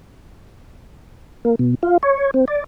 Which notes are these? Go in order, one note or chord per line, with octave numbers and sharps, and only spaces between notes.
A#3
B2
F4
C#5
C4
D5